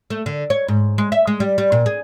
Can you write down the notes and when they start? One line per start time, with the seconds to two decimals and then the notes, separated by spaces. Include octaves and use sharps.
0.10 A3
0.26 D3
0.50 C#5
0.68 G#2
0.98 G#3
1.12 E5
1.27 G#3
1.40 G3
1.58 G3
1.72 A#2
1.86 G#4